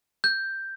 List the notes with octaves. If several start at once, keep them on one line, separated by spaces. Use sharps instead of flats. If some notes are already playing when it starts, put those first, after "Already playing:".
G6